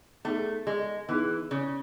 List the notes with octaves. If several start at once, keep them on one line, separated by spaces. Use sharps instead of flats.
A3 B3 D#4 G#4
G#3
E3 B3 D#4 G#4
C#3